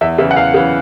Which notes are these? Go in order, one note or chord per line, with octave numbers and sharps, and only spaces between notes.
E2 E5
C#3 E3 E5
F#5
E2 F5
C#3 E3